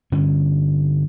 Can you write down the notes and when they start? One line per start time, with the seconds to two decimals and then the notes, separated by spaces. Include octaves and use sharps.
0.12 G2 D3 C#4